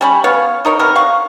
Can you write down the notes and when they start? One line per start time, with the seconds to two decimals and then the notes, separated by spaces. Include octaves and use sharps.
0.01 G3 C#4 B5
0.24 B3 C#5 F5
0.65 D#4 A#4 C#5 C6
0.79 C3 B3 A#4
0.96 F5 F#5 C#6